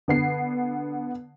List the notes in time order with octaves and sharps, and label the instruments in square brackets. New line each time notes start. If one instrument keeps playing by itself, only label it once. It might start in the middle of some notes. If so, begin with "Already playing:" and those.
[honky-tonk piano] D3 B3 C7